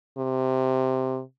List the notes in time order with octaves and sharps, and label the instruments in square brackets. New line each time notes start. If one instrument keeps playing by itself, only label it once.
[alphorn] C3